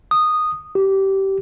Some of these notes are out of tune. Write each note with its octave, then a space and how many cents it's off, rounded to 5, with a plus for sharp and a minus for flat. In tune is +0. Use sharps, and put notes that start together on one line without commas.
D#6 -10
G4 -20